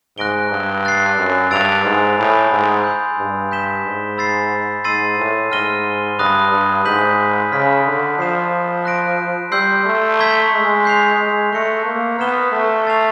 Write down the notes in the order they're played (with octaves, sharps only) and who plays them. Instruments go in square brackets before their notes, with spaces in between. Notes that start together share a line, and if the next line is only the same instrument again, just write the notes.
[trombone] G#2 [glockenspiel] F#6 A#6 D7 G7
[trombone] G2
[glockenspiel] F#6 A6 C7
[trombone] F#2
[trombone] G2 [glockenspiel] E6 A6 D7 F7
[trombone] G#2
[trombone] A2 [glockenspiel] G#5 B5 D#6 G6
[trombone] G#2
[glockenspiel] C6 E6 G6
[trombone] G2
[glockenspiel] G6 B6 E7 G7
[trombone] G#2
[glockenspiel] B5 E6 A6 C7
[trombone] G#2 [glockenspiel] C6 E6 A6 C7 D#7
[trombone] A2
[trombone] G#2 [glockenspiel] F6 A#6 D#7 G7
[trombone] G2 [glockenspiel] B5 D#6 F#6 A#6
[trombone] G2
[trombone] G#2 [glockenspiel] G6 B6 D#7 F#7
[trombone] C#3 [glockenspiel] C6 F6 G#6 B6 D7
[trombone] D3
[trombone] F3 [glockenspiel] G6 C7 E7
[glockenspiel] F#6 A#6 D7
[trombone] G3 [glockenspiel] C6 E6 G6 C7
[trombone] A3
[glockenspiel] A#5 C#6 E6 G#6 B6
[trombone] G#3
[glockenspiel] G6 C7 F7
[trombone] G#3
[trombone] A3 [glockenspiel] C#6 F#6 A#6 C#7
[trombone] A#3
[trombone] B3 [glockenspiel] F6 G#6 B6 E7 G7
[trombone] A3
[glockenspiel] E6 A6 C7 F7